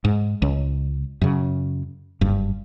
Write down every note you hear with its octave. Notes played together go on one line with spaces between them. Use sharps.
G#2
C#2
F#2 C#3
F#1 G2